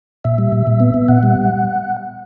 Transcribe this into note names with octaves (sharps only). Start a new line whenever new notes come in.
A#2 E5
G3
A#2
A#2
B3
B3
A#2 F#5
G3